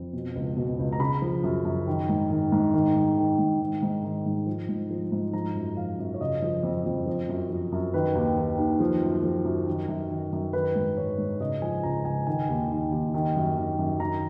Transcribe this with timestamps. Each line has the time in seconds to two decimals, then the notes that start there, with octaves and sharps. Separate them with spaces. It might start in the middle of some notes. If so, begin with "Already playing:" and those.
Already playing: F2
0.13 B2
0.35 C#2
0.57 B2
0.79 C#2
0.93 A#5
1.00 C#3 B5
1.22 F3
1.43 F#2
1.65 F#2
1.87 D#3
2.09 G#2
2.30 D#3
2.52 G#2
2.74 D#3
2.96 G#2
3.18 D#3
3.39 G#2
3.60 D#3
3.82 G#2
4.03 D#3
4.26 G#2
4.47 F3
4.69 G#2
4.91 F3
5.12 G#2
5.33 F3 A#5
5.55 F#2
5.77 F3 F5
5.99 F#2
6.14 C#5
6.20 C#3 D#5
6.42 F3
6.63 F2
6.86 F2
7.06 F3
7.29 F#2
7.50 F3
7.72 F#2
7.94 D#3 B4
8.15 D#2
8.37 D#3
8.58 D#2
8.80 F3
9.02 F#2
9.23 F3
9.45 F#2
9.67 D#3
9.88 F#2
10.10 D#3
10.33 F#2
10.53 D#3 B4
10.76 G#2
10.97 D#3 C#5
11.18 G#2
11.40 C#3 D#5
11.62 F3 G#5
11.83 C#2 A#5
12.05 C#2 G#5
12.27 D#3 G#5
12.49 D#2
12.70 D#3
12.92 D#2
13.14 D#3
13.36 F#2
13.57 D#3
13.79 F#2
14.00 D#3 A#5